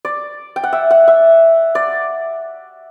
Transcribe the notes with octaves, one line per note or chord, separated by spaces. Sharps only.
D5
G5
F#5
E5
F#5
E5
D5